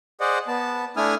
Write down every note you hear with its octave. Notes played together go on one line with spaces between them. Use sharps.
G#4 C5 D5 D#5 F#5
B3 A5
A3 D4 E4 G#5 D#6 F6